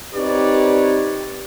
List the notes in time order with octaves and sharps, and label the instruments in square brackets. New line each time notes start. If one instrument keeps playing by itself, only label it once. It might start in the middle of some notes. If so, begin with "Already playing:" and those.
[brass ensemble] C4 D#4 G4 B4 C#5 D5